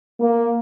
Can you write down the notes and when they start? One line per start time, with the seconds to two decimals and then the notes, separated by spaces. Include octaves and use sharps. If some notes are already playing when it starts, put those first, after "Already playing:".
0.21 A#3